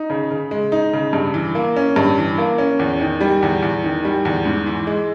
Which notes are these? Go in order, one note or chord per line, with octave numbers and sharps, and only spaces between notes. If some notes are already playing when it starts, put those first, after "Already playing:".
Already playing: D#4
C#3
C#3
G#3
D#4
C#3
G2
E3
A#3
C#4
G2
E3
A#3
C#4
E2
D#3
G3
E2
E2
D#3
G3
E2
G#2
E3
G#3